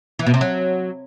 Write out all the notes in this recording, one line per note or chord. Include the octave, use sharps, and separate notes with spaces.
E3
B2
C3
F#3